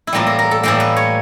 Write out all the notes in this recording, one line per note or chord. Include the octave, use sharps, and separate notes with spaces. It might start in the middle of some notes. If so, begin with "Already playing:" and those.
E4
A2 E3 G3 A#3 F4
A#4
A#4
A4
A2 E3 G3 A#3 A#4
B4
C#5